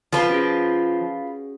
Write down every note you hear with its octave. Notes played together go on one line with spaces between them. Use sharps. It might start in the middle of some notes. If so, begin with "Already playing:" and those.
F3 F4 B4
C#4 F#4 G#4